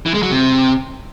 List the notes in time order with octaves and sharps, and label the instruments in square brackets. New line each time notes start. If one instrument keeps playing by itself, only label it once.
[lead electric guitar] E3
G#3
F#3
C3